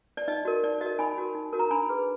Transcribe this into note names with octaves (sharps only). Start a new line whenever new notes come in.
D5
D#4 D#5
F#4 A#4
D#4 D5
F#4 A#4 D#5
D#4 G#5 B5
F#4 A#4
D#4
F#4 A#4
A#5
D4 G#5 B5
G#4 B4